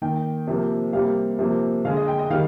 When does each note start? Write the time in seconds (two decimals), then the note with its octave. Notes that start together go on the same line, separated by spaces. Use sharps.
0.02 D#3 A#3 G5
0.47 C3 F3 A#3
0.93 C3 G3 A#3 F5
1.39 C3 F3 A#3
1.85 D3 G#3 F5
1.96 D#5
2.08 G5
2.19 D#5
2.30 D#3 G3 F5